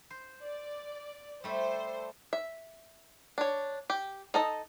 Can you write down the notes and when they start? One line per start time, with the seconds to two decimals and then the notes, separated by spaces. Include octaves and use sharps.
0.10 C5
0.43 D5
1.44 G3 A3 A4 C5
2.33 E5
3.38 D4 C#5
3.90 G4
4.34 D#4 A4 D#5